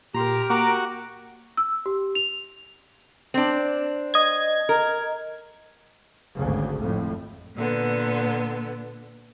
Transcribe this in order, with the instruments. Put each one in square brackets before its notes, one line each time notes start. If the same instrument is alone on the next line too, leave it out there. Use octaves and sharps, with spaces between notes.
[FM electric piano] A#2 C6 [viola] G4 A#4 [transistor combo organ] A#5
[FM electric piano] A#3 [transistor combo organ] F#4 [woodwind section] A#5 D6
[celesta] E6
G4
F7
[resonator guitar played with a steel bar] C4 D4
[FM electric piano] D#5 G#6
[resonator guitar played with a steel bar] A#4
[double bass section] G#1 D2 C#3
F2 A2
[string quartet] A#2 D3 B3